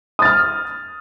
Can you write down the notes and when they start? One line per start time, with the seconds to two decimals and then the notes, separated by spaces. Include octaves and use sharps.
0.19 D#6
0.22 A6
0.25 F6